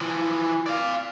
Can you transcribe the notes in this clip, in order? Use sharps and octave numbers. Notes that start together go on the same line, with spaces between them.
E3 F3
D5 F5